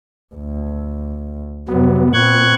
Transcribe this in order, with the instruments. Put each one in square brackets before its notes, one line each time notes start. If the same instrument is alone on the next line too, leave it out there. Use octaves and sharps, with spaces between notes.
[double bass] D2
[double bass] F2 C3 [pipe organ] F#3 [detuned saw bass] B3
[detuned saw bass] A#2 [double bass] B3 C4 [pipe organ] C#6 F#6 G#6